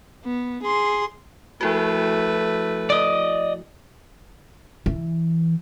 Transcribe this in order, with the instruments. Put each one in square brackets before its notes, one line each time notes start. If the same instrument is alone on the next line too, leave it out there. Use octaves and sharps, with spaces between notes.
[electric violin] B3
G#4 C6
[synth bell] F3 E4 F#4 [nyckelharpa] A3 B4
[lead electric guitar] D5 D#5
[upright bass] E3